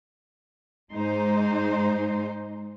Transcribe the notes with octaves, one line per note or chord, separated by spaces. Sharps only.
G#2 G#3 D#4 C5